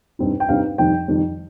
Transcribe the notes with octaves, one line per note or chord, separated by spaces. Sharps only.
G2 G3 C4 D#4
G5
G2 G3 C4 D#4 F5
F2 D#3 G3 G5
F2 D#3 G3